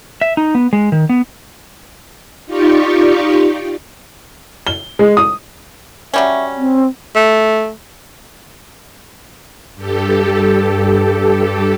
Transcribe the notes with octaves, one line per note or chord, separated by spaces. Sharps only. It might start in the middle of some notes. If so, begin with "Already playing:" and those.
E5
D#4
B3
G#3
D#3
B3
D#4 F4 G4 D5 C#6
G7
G#3
D#6
F#3 G3 C#4 E5
C4
A3
G2 G4 A4